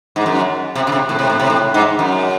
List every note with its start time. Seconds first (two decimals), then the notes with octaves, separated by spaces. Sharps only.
0.16 G#2
0.26 F#2
0.75 C3
0.87 C#3
0.92 C3
1.09 A2
1.19 C3
1.29 A2
1.40 C3
1.50 A2
1.74 G#2
1.99 F#2